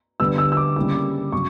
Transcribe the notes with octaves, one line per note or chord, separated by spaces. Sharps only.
D3 G3 B3 E6
E6
E6
D6
C#3 G3 A#3 E4 D6
C#3 F#3 C#6